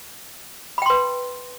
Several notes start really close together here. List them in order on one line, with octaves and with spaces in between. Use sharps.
B5 G5 C6 B4